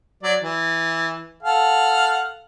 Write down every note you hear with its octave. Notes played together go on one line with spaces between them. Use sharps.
F#3 D5
E3
A4 F5 F#5